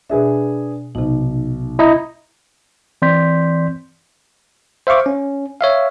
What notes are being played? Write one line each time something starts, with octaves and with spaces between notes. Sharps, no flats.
B2 D4 G#4 B4 E5
B1 C3 D#4
E4 D#5 A#5
E3 C4 D5 C6 G6 B6
C5 E5 F5 C#6 D6
C#4
C#5 E5 F5